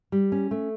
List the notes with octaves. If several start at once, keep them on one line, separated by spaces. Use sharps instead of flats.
G3
C#4
A3